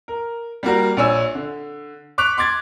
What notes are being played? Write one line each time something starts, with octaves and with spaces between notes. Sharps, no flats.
A#4
G3 A#3 F#4 A#4
A#1 D4 C#5 G#5 E6
D3
C#6 D6 F#6 B6 F7
C6 D6 G#6 A6